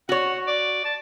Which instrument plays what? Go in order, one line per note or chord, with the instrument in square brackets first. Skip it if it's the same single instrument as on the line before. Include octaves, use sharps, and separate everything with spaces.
[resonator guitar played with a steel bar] F#4 C#5 [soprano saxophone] F#5
[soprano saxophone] D5
A5